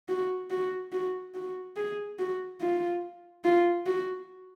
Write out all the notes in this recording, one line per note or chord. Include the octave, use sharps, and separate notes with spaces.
F#4
F#4
F#4
F#4
G#4
F#4
F4
F4
F#4